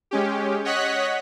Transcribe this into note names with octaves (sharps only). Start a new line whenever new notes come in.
G#3 C#4 G4
C#5 D#5 F#5 F#6 B6